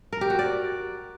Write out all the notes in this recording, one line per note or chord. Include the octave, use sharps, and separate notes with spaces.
A#4
G4
F#4
D5